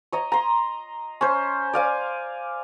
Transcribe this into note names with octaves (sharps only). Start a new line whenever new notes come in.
C#5 D#5 A#5
A#5 C6
C#4 C5
D5 F5 G#5